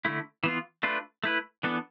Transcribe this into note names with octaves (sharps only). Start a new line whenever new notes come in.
D3 A3 E4
E3 B3 F4
A3 D4 F4 B4
A3 E4 B4
E3 B3 D4 A4